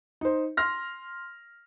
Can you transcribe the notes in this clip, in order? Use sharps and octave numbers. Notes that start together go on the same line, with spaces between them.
D#4 C5
C6 F6 A#6